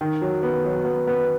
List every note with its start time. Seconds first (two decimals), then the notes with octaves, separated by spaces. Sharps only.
0.01 D#3
0.22 F#3
0.43 B3
0.65 F#3
0.85 B3
1.07 B3